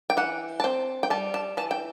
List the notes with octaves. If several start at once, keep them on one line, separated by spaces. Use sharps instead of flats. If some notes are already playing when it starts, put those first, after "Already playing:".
G5
E3 F#5
A5
C4 G5
G5
G3 A5
A5
E3 A5
G5